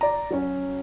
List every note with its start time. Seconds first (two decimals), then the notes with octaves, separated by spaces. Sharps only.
0.01 D5 A#5
0.31 F#3 C#4